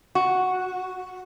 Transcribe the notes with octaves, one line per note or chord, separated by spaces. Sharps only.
F#4